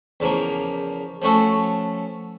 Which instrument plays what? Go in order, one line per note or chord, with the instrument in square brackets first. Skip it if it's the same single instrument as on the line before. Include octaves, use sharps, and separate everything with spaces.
[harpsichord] E2 C#3 F3 A#3
F3 A3 C#4 F#4 A4